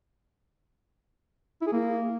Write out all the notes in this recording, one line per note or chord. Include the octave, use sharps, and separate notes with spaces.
E4
G#4
A#3